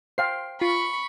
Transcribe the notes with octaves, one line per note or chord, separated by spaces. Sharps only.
C5 F5 G5 C7
F4 B5 C#6